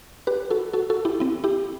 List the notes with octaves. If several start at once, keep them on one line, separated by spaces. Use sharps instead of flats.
G4 B4
F#4 A4
F#4 A4
F#4 A4
E4 G4
C4 E4
E4 G4